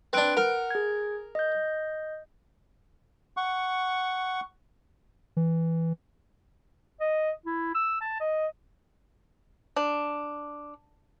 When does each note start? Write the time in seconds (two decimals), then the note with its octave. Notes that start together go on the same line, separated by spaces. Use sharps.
0.13 C4 D4 B4 F#6 D7
0.37 A#4 F#5
0.71 G#4 G#6
1.35 D#5 G6
3.37 F#5 C#6
5.37 E3
7.00 D#5
7.46 E4
7.75 E6
8.01 A5
8.20 D#5
9.76 D4